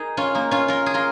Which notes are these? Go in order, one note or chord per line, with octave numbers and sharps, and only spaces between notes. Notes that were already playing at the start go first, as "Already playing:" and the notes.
Already playing: D#4 G#4 A#4
C#4 F4
A#3 D#4
C#4 F4
F4 A#4
G#4
F4 A#4